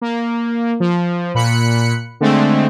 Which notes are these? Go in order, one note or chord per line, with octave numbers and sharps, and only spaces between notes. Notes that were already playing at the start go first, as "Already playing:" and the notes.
A#3
F3
A#2 B5 F#6 C#7
D3 G#3 A3 C4